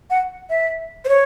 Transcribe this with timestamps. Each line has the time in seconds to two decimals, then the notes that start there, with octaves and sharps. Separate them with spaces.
0.10 F#5
0.50 E5
1.05 C5
1.09 C#5